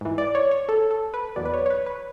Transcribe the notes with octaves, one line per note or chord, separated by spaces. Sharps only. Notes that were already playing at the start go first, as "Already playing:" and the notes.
G#2 E3
D5
C#5
C#5
A4
A4
B4
E2 B2 F#3 D5
B4
C#5
C#5
B4
B4